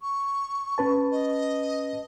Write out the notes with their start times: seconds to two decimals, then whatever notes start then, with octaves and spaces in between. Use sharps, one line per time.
0.01 C#6
0.78 C#4 B4 A5
1.12 D#5